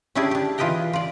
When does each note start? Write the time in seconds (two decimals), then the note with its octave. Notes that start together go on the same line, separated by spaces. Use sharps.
0.15 C#4 D4 E4 G4 G#4 D5
0.31 D4 G4
0.58 E3 F4 B4 D#5 G5 A#5
0.93 F4 D5